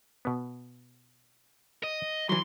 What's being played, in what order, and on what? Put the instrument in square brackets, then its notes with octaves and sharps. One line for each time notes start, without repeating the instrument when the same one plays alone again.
[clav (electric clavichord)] B2 B3
[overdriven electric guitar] D#5
[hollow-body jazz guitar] E3 F#3 [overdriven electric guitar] C6